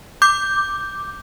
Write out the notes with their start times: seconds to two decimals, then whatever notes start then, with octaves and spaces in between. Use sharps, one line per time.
0.22 D6 G6